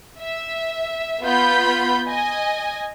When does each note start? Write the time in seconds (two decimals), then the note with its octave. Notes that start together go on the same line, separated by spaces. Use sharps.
0.19 E5
1.22 B3 F4 B5 G6
2.06 D#5 G#5